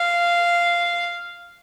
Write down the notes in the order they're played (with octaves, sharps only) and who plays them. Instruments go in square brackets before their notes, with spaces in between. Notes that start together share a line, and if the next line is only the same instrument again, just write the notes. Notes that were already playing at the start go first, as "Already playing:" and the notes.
Already playing: [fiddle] F5